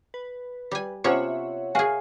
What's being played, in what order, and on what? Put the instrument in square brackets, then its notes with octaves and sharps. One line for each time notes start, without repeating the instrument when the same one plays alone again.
[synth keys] B4
[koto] G3 G#5
[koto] C3 B3 C#4 [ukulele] F4 [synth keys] C#5 E5 F#5
[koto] F#4 G#4 [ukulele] A#4 F5 G#5